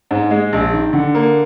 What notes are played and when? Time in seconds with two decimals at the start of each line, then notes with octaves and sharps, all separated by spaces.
0.11 G#2
0.31 G#3
0.52 A#1
0.73 D#3
0.93 D3
1.15 A#3